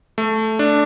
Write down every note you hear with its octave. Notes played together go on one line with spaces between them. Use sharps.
A3
D4